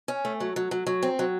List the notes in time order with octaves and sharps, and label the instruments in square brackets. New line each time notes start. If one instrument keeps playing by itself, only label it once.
[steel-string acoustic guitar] C#4
A3
F#3
F#3
F#3
F#3
C4
F#3